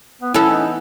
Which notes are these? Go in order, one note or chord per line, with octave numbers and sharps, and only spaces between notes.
B3
E3 B3 C#4 E4 A4
D#4